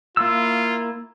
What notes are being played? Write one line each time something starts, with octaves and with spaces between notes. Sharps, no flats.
A#3 E4 F4 E6